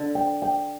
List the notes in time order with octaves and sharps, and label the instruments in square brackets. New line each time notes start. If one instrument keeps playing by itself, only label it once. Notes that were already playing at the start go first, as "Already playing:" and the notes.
Already playing: [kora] D3
[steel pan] G5
G5